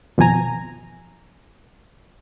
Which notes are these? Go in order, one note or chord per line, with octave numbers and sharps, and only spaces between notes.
G#1 F2 B2 G#5 A#5